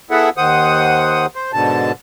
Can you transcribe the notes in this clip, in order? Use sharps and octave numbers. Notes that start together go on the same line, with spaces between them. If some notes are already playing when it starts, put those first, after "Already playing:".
B3 E4 G#4 A4 E5 F#5
D#2 D#3 C5 F#5 D#6
C5
G#2 B2 D3 A5